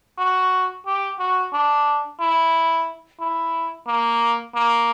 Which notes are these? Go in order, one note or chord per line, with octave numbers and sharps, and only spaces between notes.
F#4
G4
F#4
D4
E4
E4
A#3
A#3